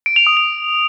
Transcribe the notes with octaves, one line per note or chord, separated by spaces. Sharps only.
D7
F7
D#6
F7